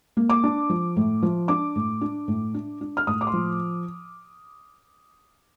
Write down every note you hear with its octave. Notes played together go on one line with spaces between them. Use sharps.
A#3
D6
D4
F3
A2
F3
D4 D6
A2
D4
A2
D4
D4
F6
A2 D#6
D6
C6
F3